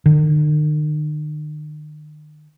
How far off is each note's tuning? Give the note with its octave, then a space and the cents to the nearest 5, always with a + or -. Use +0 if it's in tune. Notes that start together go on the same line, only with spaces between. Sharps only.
D#3 -45